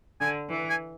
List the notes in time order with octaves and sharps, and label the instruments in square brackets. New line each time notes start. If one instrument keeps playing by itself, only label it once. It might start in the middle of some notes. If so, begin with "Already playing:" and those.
[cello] D3 [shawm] G#5
[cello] E3
[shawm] G#5